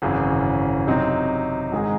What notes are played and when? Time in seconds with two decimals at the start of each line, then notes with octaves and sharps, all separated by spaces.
0.02 G#1 F#2 C#3 E3
0.87 C3 F#3 C4 D#4
1.72 G#2 D#3 G#3 D#4 G#4